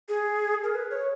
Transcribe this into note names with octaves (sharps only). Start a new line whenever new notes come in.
G#4
A#4
B4
C#5